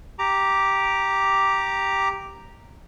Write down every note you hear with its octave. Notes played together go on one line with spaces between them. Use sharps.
G4 A#5 D6